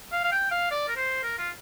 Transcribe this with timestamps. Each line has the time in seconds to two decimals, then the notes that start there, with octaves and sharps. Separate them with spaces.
0.12 F5
0.24 F5
0.32 G5
0.51 F5
0.71 D5
0.88 A#4
0.96 C5
1.23 A#4
1.38 F4